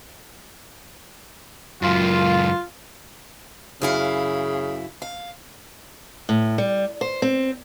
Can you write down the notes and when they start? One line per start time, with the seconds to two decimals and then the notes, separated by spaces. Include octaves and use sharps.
1.82 C#2 F#2 F4
3.82 F#2 C#3 E4 F5
5.02 F5
6.29 A2
6.58 G3
7.01 C5
7.22 C4